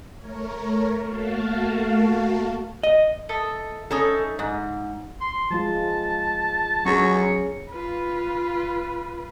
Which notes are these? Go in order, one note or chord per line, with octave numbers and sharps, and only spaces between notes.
A3 A#4 C#5
A3 A#3 F#4 F5 A5
D#5
A4 D#5 E5
C#4 D#4 E4 A4
G#2
C6
F3 G#3 F4 A5
F#3 C#4 G#4 C#6
F4 B4